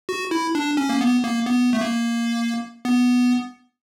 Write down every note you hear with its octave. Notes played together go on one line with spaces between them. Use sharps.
F#4
E4
D4
C#4
A#3
B3
A#3
B3
A3
A#3
B3